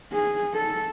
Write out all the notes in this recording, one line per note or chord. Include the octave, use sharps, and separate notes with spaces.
G#4
A4